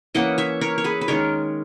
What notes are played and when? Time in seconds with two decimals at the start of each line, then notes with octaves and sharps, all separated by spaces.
0.15 E3 A#3 C#4 D#5 F#5
0.38 C#5 E5
0.61 A#4 C#5
0.78 C#5
0.84 G#4 B4
1.01 B4
1.08 D#3 G#3 C#4 A#4 C#5